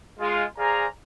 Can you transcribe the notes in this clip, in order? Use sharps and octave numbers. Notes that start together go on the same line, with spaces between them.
G#3 F4
G#4 C5 D5 F5 G#5 A#5